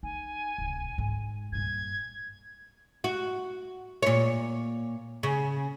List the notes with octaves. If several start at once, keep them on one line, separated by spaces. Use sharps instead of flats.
D#4 G#5
D1 C2
G#2
G2 A#2 G#6
F#4
A#2 C#5
C#3